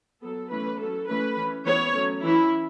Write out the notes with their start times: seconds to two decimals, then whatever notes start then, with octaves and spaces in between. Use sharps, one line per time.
0.22 F#3 B3 A4
0.51 E3 A3 C#4 B4
0.79 F#3 A3 C#4 A4
1.08 E3 A3 C#4 B4
1.37 E3 C#4
1.65 E3 B3 C#5
1.94 F#3 A3 C#4
2.23 E3 C#4 E4